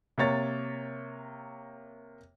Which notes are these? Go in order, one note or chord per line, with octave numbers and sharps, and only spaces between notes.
C3 A#3 C#5 A6